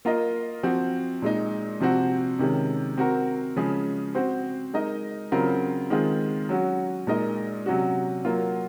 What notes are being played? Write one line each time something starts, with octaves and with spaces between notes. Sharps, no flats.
A#3 F4 A#4 D#5
F3 C4 F#4
A#2 G#3 D#4
C3 F3 C4 F#4
C3 D#3 G#3 C#4
C4 F#4 A#4
C#3 F3 G#3 C#4 G#4
C4 F#4 C5
G#3 D#4 A#4 D#5
C#3 F#3 C4 F4 A#4
D#3 G#3 C4 F4 G#4
F#3 C#4 F#4
A#2 G#3 D#4 A#4 D#5
C3 F#3 C#4 F#4
F#3 A#3 F4